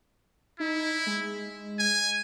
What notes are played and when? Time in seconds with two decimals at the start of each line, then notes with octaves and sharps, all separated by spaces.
0.60 D#4 E4
1.06 G#3
1.79 G#5